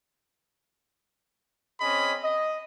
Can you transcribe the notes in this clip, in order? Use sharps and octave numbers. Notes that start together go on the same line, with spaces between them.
C4 C#4 G#4 D#5 B5
D#5